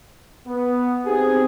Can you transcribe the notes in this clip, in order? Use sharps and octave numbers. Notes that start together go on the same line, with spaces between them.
B3
C4 D#4 G4 G#4